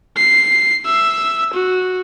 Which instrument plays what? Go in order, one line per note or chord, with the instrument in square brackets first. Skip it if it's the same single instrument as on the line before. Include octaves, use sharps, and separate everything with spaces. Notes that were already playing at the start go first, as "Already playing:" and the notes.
[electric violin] C7
E5
F#4